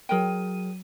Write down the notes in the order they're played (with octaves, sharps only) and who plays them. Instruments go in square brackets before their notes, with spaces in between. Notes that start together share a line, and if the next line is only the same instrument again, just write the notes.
[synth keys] F#3 D#7 [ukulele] G#4 A#4 G5